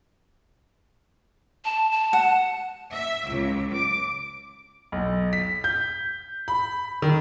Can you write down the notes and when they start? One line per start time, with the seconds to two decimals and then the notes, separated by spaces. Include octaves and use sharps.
1.65 A5
1.92 A5
2.13 F#5
2.93 E5
3.27 C#2
3.73 D6
4.92 B1
5.33 B6
5.64 G6
6.48 B5
7.02 D#3